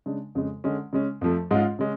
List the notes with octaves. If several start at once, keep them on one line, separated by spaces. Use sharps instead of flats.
C#3 G#3 D4
F2 C#3 G#3
D3 G#3 C#4
C#3 G#3 C#4
F2 F3 A3
G#2 G#3 C#4 F4
C#3 G#3 C#4